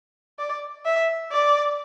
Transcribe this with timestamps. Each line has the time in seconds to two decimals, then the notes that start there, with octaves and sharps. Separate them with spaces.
0.39 D5
0.85 E5
1.32 D5